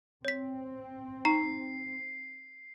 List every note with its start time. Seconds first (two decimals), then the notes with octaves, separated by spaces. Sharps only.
0.25 C4 C#5 B6
1.25 D#4 A#5 C7